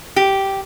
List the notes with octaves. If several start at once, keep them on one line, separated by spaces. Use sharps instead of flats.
G4